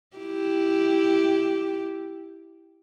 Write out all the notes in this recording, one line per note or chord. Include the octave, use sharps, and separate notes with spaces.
E4 G4